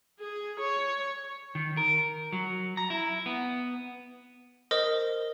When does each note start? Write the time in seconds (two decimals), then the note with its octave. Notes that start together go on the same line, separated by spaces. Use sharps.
0.20 G#4
0.60 C#5
1.55 D#3
1.77 A#4
2.32 F#3
2.77 A#5
2.90 E4
3.26 B3
4.71 A#4 C5 D#5 D#6